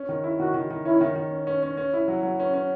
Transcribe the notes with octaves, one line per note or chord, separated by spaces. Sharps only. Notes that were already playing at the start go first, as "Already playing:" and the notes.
Already playing: C#4
D#3
E4
D#3 F#4
D#3
D#3
C#4 E4
D#3
D#3
C#4
C#4
C#4
C#4
E4
F#3
F#3
C#4
C#4